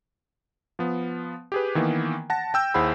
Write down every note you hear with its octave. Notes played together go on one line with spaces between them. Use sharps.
F3 B3
G4 G#4 B4
D#3 E3 A#3 B3
F#5 A5 A#6
G5 E6 G6
D#2 E4 G#4 C5 F#5 B5